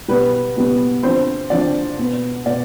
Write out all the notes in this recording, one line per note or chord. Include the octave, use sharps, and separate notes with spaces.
B2 G3 B3 B4
B2 G3 B3
D3 F3 C4 C5
D3 F3 C4 D5
B2 B3
B2 D5